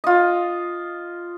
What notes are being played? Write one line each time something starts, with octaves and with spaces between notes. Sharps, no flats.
F4 D#5